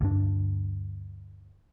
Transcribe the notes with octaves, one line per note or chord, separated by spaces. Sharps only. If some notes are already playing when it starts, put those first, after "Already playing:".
D2 G2 D4